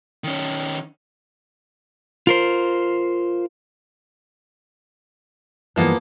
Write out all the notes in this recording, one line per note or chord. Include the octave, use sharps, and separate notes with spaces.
D#3 C#4
F4 A#4 C5
G2 E3 F3 G#3 A#3 B3